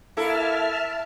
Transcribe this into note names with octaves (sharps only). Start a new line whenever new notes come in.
A#3 E4 A4 E5 A5 F6